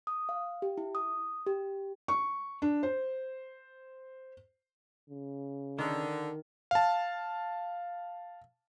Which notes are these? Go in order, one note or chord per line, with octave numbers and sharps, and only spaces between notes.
D#6
F5
G4
E4
D#6
G4
C#6
D4
C5
C#3
D3 D#3
F5 A5